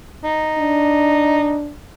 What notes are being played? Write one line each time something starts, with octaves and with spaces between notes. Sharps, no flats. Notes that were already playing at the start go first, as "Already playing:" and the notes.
D#4
D4